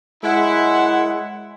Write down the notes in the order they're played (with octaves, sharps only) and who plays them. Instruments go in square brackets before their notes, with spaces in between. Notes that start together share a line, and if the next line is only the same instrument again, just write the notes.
[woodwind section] F#2 F#5 [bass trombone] G#3 [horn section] E4